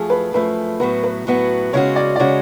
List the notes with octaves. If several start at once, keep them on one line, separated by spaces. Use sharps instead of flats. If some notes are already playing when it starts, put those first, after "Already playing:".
Already playing: F#2 F3 A3 G#4
B4
F#2 F3 A3 B4
A2 F#3 B3 F#4 B4
B4
A2 F#3 B3 F#4
C#3 G#3 C#4 F#4 C#5
D5
D5
C#3 G#3 C#4 F#4 C#5